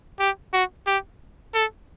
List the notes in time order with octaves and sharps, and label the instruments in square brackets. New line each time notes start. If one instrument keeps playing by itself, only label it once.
[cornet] G4
F#4
G4
A4